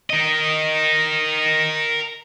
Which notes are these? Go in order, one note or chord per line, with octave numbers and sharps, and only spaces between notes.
A#4 D#5